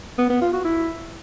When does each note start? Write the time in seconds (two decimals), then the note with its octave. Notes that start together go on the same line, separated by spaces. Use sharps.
0.18 B3
0.30 B3
0.41 F4
0.53 F#4
0.65 E4